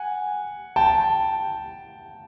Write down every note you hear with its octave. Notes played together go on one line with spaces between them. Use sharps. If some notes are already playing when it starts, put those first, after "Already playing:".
Already playing: F#5 G#5
G5 A5